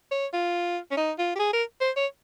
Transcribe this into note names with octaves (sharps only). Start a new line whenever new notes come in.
C#5
F4
C#4
D#4
F4
G4
G#4
A#4
C5
C#5